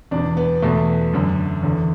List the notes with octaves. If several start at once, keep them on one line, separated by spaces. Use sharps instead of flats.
E2 B2 D4
B3
E2 B2 A3
F#2 D3
E2 D3